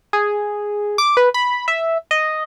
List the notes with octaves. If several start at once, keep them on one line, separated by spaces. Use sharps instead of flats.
G#4
D6
B4
B5
E5
D#5